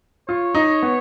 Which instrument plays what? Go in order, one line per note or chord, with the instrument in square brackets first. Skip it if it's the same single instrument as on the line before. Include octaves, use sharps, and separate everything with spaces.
[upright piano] F4 [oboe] C#5
[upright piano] D#4
B3